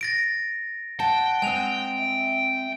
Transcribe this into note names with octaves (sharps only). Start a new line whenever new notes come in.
A6 A#6 D7
F#5 G5 A5
G#3 C4 G#5 F7
E5